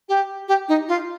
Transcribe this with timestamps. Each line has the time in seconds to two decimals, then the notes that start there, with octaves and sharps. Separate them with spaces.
0.09 G4
0.48 G4
0.69 D#4
0.88 F4